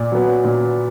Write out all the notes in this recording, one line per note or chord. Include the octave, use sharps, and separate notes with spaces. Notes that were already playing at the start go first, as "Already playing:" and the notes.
Already playing: A#2 D5
F#3 B3
A#2